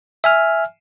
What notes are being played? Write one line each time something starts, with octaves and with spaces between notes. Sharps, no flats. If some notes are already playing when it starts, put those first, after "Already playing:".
E5 G#5 F6